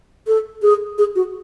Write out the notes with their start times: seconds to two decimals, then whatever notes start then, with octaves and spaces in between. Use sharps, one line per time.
0.27 A4
0.62 G#4
0.98 G#4
1.16 F#4